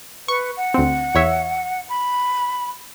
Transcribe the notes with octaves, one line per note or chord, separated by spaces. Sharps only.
B4 C#6
F#5
D2 C4
E2 C#5 E5
B5